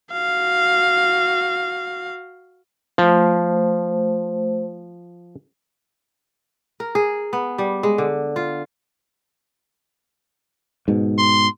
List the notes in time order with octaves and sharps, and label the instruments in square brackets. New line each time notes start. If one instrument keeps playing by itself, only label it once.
[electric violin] F#4 F5
[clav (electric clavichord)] F3 [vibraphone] A3 C5
[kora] A#4
G#4
B3
G3
G#3
D3
F4
[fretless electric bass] G#2 B2
[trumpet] C6